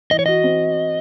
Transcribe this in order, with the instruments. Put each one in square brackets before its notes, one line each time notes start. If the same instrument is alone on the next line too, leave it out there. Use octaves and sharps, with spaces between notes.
[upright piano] E3 [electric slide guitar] D#5
[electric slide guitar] C#5
[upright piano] F#4 [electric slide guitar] D#5
[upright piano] C4